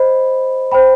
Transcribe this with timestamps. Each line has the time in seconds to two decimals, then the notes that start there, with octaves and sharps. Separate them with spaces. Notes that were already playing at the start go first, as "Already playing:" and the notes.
Already playing: C5 D#5 B5
0.72 C5 G5 B5